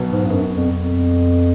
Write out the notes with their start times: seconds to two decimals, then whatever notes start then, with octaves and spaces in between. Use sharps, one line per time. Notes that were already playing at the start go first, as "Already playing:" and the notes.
Already playing: B1 B2 F#3 B3
0.11 G#2
0.27 G2
0.32 F#2
0.54 F2
0.76 F2